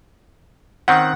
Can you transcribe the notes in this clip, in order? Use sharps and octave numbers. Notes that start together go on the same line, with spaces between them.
D#3 C4 C#4 F#5